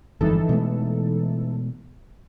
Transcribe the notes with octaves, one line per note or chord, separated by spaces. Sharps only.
G1 F2 G#2 E3 D#4 A4
B2 G#3 A3